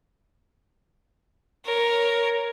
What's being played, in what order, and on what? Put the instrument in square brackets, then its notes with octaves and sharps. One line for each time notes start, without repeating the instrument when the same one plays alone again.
[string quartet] A#4 C#5